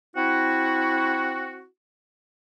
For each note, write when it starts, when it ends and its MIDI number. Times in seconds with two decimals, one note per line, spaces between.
0.16 1.65 60
0.16 1.65 64
0.16 1.65 66